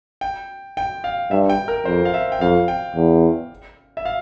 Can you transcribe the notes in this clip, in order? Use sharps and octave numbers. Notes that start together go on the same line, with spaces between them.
G5
G5
F5
G2 E5
G5
A#4
F2 C5
F5
E5
G5
F2 F5
G5
E2
E5
F5